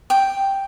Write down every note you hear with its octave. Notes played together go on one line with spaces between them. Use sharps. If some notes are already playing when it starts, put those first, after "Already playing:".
G5